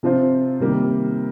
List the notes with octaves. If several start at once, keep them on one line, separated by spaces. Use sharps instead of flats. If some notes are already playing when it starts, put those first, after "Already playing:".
C3 F3 C4 F4 C5
C3 D#3 G3 A#3